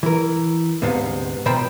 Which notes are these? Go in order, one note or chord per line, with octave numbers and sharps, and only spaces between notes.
E3 A#4
D2 G#2 C3 B3 F5
B2 F3 C5 G5 A#5 B5